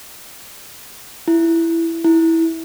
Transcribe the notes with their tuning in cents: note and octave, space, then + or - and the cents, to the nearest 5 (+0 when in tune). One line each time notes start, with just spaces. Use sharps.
E4 +10
E4 -10